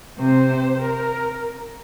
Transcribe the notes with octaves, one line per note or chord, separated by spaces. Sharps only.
C3 C5
A#4